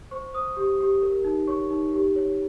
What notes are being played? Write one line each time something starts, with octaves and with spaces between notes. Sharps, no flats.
C5 C#6
C5 D#6
G4
G4
A#4
D#4
C#5 C#6
D#4
G4
C#5